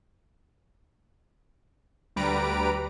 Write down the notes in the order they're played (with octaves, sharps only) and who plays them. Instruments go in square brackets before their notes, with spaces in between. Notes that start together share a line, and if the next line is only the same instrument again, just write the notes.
[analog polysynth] D2 G3 B4 A#5 D7